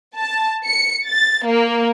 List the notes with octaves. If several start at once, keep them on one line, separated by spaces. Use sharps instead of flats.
A5
C#7
A6
A#3